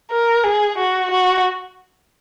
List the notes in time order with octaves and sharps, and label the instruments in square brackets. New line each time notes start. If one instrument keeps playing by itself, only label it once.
[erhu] A#4
G#4
F#4
F#4